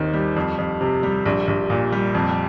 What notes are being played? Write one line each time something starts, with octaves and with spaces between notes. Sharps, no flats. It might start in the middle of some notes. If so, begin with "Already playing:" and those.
Already playing: D#2 D#3 C4
G3
F2
F2
C3
G3
A#1
A#1
A#2
G3
F2